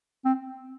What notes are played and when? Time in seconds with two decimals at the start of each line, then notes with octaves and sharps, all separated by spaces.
0.25 C4